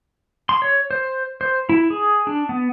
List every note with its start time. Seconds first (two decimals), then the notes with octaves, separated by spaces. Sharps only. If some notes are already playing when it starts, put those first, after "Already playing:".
0.49 C6
0.62 C#5
0.91 C5
1.41 C5
1.69 E4
1.90 G#4
2.27 D4
2.49 B3